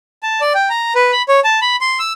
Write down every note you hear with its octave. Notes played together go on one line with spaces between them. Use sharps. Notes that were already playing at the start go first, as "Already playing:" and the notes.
A5
D5
G5
A#5
B4
B5
C#5
A5
B5
C6
E6